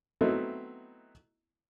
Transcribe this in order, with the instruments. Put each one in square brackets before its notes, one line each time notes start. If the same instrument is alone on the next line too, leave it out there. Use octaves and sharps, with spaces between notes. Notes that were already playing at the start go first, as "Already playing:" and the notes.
[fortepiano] F#3 A3 B3 C4 D#4 E4